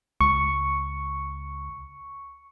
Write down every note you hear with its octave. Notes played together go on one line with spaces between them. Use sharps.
C#2 C#6